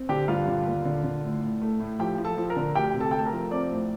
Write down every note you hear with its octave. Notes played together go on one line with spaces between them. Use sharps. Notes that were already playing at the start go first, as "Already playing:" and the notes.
Already playing: C4
D3 G4 G5
G2 F4 F5
D3
D#2
D3
D3
A2
A2
A3
A2
F3 G4 G5
F3
A4 A5
F3
A#4 A#5
D3
D2 G4 G5
C3
A4 A5
A3 G5
A5
A#4 A#5
F3
C4 D5 D6
A2